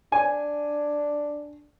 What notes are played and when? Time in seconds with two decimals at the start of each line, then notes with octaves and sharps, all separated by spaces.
0.12 D4 G#5